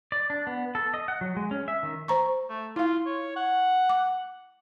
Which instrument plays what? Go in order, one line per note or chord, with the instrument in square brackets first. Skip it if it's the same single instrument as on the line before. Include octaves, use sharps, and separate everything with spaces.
[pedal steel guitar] D5
D4
B3
A4
D#5
F#5
F#3
G#3
C#4
E5
D#3
[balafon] C5 A#5 C#6
[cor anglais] A3
[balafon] E4 F5 [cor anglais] F4
[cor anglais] C#5
F#5
[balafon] D6